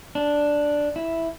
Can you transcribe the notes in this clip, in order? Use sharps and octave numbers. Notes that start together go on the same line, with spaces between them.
D4
E4